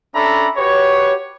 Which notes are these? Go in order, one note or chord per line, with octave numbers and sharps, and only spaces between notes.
C#4 D4 A4 E5 A#5 B5
F#4 G4 B4 C#5